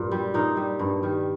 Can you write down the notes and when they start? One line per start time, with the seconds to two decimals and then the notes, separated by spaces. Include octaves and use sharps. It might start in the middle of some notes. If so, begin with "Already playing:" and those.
Already playing: G2 A#2
0.11 G3
0.34 A#2 D#4
0.57 G3
0.79 G2
1.03 D#3 G3